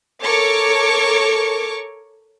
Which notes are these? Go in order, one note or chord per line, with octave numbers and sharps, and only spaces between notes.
A4 A#4 C#5 C#6 D6